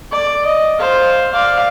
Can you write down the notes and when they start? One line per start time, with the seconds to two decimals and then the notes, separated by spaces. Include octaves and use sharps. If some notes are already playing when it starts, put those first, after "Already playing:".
0.12 D5
0.45 D#5
0.80 C5 F5
1.32 D5 F5